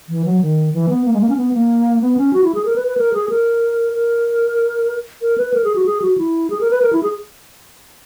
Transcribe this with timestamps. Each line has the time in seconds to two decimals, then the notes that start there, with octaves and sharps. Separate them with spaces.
0.09 E3
0.25 F#3
0.41 D#3
0.73 E3
0.89 B3
1.05 A#3
1.13 G#3
1.21 A#3
1.29 C#4
1.37 B3
1.53 A#3
2.01 B3
2.17 C#4
2.33 F#4
2.44 E4
2.55 G#4
2.65 A#4
2.76 B4
2.87 B4
2.97 A#4
3.14 G#4
3.29 A#4
3.93 A#4
5.22 A#4
5.38 B4
5.54 A#4
5.64 G#4
5.75 F#4
5.86 G#4
6.02 F#4
6.18 E4
6.50 G#4
6.61 A#4
6.71 B4
6.82 A#4
6.93 E4
7.03 G#4